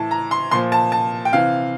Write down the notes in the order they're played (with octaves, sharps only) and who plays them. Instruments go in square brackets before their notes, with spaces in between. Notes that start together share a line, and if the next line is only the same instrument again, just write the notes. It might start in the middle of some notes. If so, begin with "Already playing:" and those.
Already playing: [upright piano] A2 E3 A5
A#5
C6
A#2 F3 C6
A5
A5
G5
C3 E3 F5